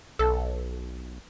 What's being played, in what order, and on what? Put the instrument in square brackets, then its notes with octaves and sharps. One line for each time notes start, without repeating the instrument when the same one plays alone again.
[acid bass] B1 [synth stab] A4